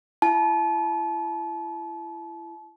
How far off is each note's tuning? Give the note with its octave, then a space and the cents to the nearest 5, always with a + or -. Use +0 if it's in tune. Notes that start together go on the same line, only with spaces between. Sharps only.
E4 +30 A5 -35